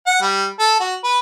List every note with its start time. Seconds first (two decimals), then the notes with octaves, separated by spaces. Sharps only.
0.06 F#5
0.22 G3
0.59 A4
0.80 F#4
1.04 B4